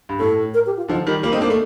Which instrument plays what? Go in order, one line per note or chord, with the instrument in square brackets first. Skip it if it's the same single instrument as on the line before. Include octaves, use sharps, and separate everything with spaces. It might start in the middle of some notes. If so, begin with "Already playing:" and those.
[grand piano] G2
[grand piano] A2 [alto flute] A4
[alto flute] A#4
G4
F4
[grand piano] D3 F3 [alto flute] D#4
[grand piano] D#3 G3 [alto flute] D#4
[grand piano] G3 A#3 [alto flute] F4
[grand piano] C4 D#4
[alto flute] A4
[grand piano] A#3 D4
[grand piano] A3 [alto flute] A4